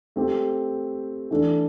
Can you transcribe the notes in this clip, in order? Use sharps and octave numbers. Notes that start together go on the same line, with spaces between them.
A3 C4 G4
E3 A3 D4 A4